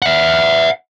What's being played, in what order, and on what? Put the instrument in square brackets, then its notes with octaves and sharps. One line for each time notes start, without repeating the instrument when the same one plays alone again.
[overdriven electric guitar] E5 F#5